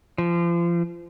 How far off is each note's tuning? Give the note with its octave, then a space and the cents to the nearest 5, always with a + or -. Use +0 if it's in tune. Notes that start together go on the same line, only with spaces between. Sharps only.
F3 -30